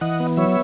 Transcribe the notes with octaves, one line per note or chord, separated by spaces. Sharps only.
E3 D#5 F#5
B3
F#3 C#5 E5